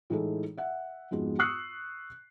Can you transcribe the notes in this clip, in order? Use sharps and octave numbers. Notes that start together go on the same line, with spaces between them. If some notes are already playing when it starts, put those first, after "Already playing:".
A2 E3 G#3 D#4 G#4 A4
E5 F#5
F2 G#2 G#3 B3 F#4
C#6 D#6 E6 F#6 C7 C#7